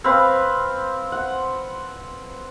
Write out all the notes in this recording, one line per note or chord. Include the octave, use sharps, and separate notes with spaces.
C4 B4 F5
F#5